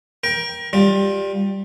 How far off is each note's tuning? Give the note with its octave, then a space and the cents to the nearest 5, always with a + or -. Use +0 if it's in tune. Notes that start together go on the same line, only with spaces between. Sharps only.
A#4 +30 G5 +5
G3 +0 F4 +25